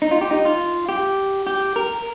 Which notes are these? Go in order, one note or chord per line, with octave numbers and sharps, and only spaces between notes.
D#4
F4
G4
D#4
F4
G4
G4
A#4